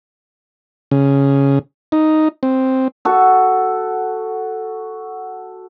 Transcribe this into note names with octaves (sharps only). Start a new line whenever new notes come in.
C#3
D#4
C4
F#4 A4